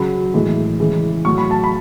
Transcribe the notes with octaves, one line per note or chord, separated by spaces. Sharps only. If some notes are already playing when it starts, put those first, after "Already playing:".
Already playing: C#3 F#3 B5
A2 E3 G#3
C#3 E3 G#3
A2 F#3 C#6
B5
A5
B5